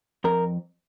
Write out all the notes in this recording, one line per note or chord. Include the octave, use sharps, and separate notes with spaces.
F2 A#4